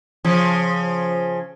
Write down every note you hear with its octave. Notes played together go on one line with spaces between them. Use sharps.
C#3 F3